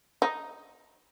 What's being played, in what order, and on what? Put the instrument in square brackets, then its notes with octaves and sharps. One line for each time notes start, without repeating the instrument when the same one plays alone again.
[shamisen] D#4